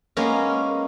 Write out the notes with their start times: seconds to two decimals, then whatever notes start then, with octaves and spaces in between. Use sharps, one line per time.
0.17 G#3 A#3 B3 C#4 A#4